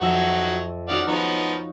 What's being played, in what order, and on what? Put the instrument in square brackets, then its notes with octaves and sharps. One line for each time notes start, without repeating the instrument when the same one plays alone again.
[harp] F2 E5 [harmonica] F#3 D#4 F#4
[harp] C#4 D#4 F#4 [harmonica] D5 F5 F#5
[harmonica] F3 B3 D#4 [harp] F4 C#5